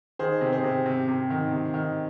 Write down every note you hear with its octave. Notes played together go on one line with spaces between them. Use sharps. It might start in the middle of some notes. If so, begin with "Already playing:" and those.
D#3 G#4 C5
C3
G#4 C5
C3
C3
C3
D#3
C3
D#3